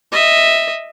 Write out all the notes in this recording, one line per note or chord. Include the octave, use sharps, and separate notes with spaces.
D#5 E5